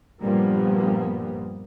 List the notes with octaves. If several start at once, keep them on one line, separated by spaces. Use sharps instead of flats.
G2 A#2 F3 G3 A#3 B3